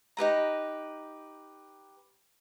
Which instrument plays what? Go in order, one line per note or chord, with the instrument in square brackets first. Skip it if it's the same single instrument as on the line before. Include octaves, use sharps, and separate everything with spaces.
[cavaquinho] D#4 G4 B4 A#5